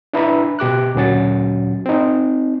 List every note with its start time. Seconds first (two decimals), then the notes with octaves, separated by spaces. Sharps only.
0.13 D4 E4 B4 E5 A#5 B5
0.59 B2 G4 D6 F#6
0.95 D2 A#2 F#3 C#4 F#4 A6
1.86 C4 D#4